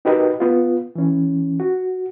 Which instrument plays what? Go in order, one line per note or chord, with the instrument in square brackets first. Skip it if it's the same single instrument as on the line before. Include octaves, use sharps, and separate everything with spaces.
[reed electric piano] D#4 F#4 G4 A#4 B4 D#5
B3 F4
E3 C#4
F#4